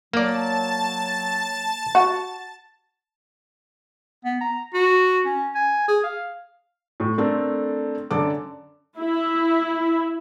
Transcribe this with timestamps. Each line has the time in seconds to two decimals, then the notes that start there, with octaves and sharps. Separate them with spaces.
0.13 F#3 A#3 D5 A5 A6
1.95 F#4
4.25 B3
4.41 A#5
4.74 F#4
5.25 C#4
5.55 G#5
5.88 G#4
6.04 F5
7.00 A2
7.18 A3 C4 D4 A4 A#4
8.11 F#2 D3 A4 D6
8.98 E4